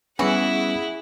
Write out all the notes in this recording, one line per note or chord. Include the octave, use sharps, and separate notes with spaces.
E3 G3 B3 C#4 E4 F#4 G#4 F#5